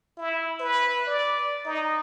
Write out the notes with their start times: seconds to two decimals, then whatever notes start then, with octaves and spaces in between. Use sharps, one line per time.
0.17 E4
0.60 B4
1.07 D5
1.65 D#4